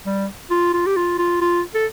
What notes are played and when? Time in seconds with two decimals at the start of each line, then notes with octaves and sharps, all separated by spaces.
0.06 G3
0.51 F4
0.74 F4
0.86 G4
0.97 F4
1.18 F4
1.41 F4
1.75 A4